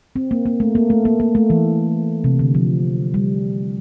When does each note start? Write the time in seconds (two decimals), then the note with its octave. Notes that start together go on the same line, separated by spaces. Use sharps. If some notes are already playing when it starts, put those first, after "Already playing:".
0.16 C4
0.31 A#3
0.46 A#3
0.60 A3
0.75 A#3
0.90 A3
1.05 A#3
1.20 A#3
1.35 A3
1.50 E3
2.24 C3
2.39 D3
2.55 F3
3.14 G3